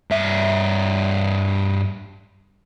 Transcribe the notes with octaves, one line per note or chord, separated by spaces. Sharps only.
G2 E5